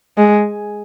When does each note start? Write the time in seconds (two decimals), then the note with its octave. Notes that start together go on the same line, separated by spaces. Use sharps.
0.18 G#3